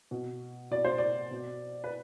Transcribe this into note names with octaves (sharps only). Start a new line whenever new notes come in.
B2
B2 D5
C5
D5
B2
B4